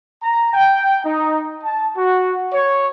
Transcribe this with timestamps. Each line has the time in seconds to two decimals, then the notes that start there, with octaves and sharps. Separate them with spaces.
0.21 A#5
0.53 G5
1.04 D#4
1.63 A5
1.96 F#4
2.52 C#5